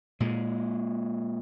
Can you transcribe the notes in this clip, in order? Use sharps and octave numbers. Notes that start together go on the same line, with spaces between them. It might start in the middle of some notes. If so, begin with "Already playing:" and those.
A#2 G#3